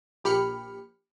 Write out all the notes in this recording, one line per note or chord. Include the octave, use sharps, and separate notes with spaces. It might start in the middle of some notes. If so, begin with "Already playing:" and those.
A#1 G4 B5 F6 C#7